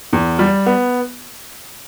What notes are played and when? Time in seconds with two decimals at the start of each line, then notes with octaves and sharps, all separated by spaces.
0.13 E2
0.39 G3
0.66 B3